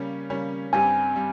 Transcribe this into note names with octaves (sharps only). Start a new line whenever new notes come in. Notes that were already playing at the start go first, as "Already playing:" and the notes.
Already playing: C#3 G3 A#3 C#4
C#3 G3 A#3 C#4
G2 G3 C4 G4 G#5
G3